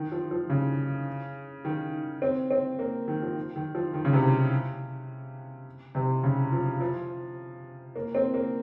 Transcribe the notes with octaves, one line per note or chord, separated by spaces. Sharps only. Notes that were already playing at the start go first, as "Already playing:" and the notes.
Already playing: D#3
F3
F3
C#3
D#3
C4
C4
A#3
D#3
F3
D#3
F3
D#3
C#3
C3
C3
C#3
F3
F3
A#3
C4
A#3